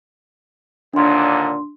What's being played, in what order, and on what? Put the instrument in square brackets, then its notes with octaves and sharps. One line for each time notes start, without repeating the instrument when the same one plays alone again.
[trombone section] D#2 A#2 D3 [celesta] D4 C6